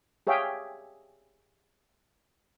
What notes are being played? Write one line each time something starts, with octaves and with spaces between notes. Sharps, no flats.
G4 G#4 C#5 E5 F5 G5